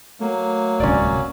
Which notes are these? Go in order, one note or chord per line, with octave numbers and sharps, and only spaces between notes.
F#3 A3 A#3
D1 C2 C#4 D5